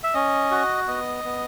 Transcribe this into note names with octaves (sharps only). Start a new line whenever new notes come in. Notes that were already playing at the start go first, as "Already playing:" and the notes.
E5
C#4 D#5
F#4
B3 D#5
B3